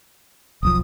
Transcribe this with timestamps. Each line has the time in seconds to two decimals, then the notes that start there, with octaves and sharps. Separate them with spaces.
0.63 E1 B1 F3 D#6